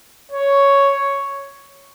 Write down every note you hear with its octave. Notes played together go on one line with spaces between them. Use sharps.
C#5